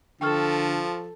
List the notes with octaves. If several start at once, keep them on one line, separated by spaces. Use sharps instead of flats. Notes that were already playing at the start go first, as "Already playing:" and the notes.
D3 F3 A4 G5 C#6 F6